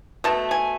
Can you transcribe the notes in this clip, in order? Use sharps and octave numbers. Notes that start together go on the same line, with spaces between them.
B2 A3 A5
G#5